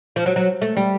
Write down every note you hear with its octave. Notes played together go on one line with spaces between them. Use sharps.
F3
F#3
F#3
A3
G3